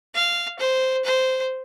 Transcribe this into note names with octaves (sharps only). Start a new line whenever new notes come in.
F5
C5
C5